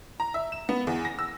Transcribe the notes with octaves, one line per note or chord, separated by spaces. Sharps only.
A#5
E5
E7
B3
E2
A#6
E6